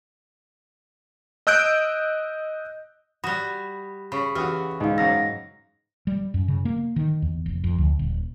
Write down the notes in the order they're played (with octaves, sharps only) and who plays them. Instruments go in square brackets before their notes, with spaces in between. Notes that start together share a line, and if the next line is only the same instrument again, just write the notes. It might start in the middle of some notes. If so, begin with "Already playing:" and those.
[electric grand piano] D#5 E6 F#6 G6 D7
[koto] G3 F#4 [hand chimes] B5 [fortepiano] D#6
[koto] C#3 [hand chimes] B5 C#6
[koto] E3 [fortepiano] F#4 D#6 F6 [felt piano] G4
[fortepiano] D2 [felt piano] G#2 [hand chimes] D#5 F5
[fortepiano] F#2 F5 E6 [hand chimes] A#6
[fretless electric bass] G3
F#2
C#3
A#3
D#3
E2
F1
F2
D2
D#1